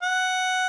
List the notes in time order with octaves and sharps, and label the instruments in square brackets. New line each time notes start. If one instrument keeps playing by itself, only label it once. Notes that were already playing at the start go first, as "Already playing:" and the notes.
[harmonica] F#5